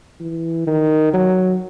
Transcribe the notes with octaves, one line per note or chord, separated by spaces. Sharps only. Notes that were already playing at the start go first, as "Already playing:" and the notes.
E3
D#3
F#3